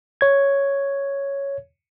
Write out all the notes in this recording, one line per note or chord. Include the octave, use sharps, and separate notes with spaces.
C#5 G#6